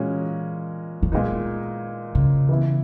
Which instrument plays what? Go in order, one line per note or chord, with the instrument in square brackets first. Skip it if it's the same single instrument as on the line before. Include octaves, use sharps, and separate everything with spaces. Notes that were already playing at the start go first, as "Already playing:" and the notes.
Already playing: [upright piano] A#2 G#3 C#4 F#4 [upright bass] E3
[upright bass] E3
[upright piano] A#2 G#3 B3 D#4 [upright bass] D#3
[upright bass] C#3
[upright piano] E3 B3 E4